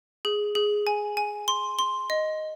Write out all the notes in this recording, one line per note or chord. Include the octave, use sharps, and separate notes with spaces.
G#4
G#4
G#5
G#5
C6
C6
D#5